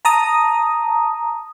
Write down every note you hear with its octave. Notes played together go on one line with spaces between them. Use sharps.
A5 A#5 D#6